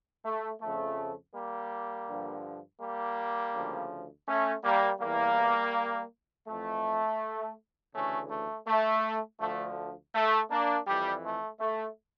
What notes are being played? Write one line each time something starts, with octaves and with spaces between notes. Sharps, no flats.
A3
F2 C#3 F3 A3
G3 A#3
G2 D3 F3
G3 A#3
D2 C#3 F3
A3 C#4
G3 A#3
E2 E3 G3 A#3
F2 E3 A3
D2 C#3 E3 A3 C#4
A3
A3
D2 D3 F3 A3
A3
A#3 D4
F2 E3 G3
A3
A3